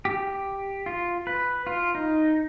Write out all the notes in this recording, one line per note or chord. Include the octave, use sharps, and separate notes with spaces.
G4
F4
B4
F4
D#4